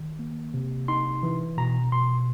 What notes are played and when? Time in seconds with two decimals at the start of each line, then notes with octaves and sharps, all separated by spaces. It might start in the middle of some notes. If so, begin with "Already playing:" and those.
Already playing: D#3
0.19 A#3
0.54 C3
0.88 D#4 C6
1.23 E3
1.57 B2 A#5
1.92 B2 C6